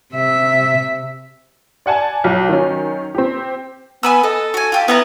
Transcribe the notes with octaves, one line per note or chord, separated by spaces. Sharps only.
C3 E5
D5 F#5 G#5 A5
B1 F#3
D#3 F#3 C#4
C4 G4
B3 G#5 B5 E6
A4 D#5
F#4 G#5
F4 G4 A4
B3 E4 F#5 A#5